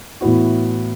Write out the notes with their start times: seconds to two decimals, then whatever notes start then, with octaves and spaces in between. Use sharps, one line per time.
0.21 A2 E3 B3 F#4